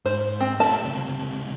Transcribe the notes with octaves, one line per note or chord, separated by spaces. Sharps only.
G#2 C5
C4
A3 G4 A5
C#2 C3